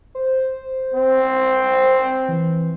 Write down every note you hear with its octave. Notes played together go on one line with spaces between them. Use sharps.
C5
C4
E3